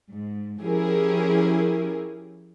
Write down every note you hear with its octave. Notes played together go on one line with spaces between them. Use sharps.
G#2
F3 C#4 E4 G4 G#4 A#4